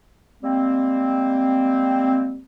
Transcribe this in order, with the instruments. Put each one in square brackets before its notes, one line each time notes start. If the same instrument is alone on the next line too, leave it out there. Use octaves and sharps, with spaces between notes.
[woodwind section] G3 G#3 A#3 C4